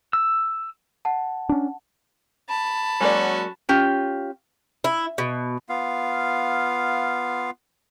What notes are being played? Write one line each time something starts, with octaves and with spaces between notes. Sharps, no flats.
E6
F#5 A5
C#4 D4
A5 B5
F#3 G#3 A#3 C#4 F#4 D5
C#4 F4 G4
E4
B2
B3 F4 F5